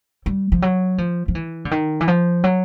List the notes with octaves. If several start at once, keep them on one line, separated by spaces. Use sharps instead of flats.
G3
F3
F#3
F3
F3
E3
D3
D#3
E3
F3
F#3